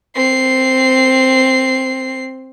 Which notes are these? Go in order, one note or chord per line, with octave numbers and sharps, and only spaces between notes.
C4 C7